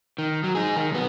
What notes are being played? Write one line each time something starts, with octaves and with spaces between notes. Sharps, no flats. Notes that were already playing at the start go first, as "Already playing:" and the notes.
D#3
F#3
D#4 G#4
D#3
B1 B3